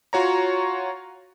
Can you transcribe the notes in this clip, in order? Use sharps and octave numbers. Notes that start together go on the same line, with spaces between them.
F4 F#4 C#5 A#5